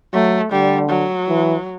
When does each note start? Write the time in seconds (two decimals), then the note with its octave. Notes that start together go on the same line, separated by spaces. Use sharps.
0.13 F#3 A3
0.52 D3 G3
0.89 F#3
1.28 E3